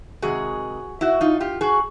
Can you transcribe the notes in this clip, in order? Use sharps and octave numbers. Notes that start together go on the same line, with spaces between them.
C3 D#3 G#3 F#4 G#4
E4 F#4
D#4 F4
F4 G4
F#4 G#4